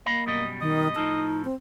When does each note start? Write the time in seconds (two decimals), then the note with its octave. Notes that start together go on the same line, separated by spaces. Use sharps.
0.06 A#3 D#5 F5 B5
0.27 F#2 B2 G3 D#5
0.61 D#3 D#5
0.96 A2 F3 D#4 A4
1.45 C4